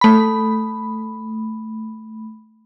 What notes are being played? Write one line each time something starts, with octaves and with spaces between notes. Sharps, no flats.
A3 B5